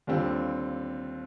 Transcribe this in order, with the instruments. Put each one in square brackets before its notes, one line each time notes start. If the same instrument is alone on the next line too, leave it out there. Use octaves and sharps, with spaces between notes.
[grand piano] D#2 D3 G3 C4 F4